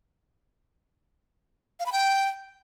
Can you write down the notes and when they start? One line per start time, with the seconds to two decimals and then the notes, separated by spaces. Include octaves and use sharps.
1.80 F5
1.86 B5
1.92 G5